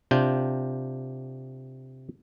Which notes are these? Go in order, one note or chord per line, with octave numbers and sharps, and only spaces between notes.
C3 D4 F4 G5